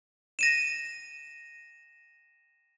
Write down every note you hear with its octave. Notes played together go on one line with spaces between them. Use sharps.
A#6 D#7 E7